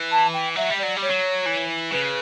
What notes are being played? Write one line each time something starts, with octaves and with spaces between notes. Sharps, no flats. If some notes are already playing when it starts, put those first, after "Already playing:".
Already playing: E3
A5
G5
F#3 E5
G3
F#3 D5
G3 C#5
F#3
E3
C#3 B4